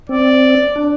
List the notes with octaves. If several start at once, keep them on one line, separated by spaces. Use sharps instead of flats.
C4 D5
D4